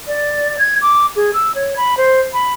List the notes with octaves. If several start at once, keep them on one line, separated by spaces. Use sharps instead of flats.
D5
G#6
D6
G#4
E6
C#5
B5
C5
B5